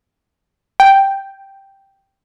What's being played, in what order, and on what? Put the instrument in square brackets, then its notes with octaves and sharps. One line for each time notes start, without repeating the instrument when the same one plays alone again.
[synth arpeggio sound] G5